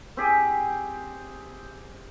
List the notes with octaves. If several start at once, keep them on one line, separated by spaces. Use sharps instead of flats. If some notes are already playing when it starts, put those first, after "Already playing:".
C4 G4 G#4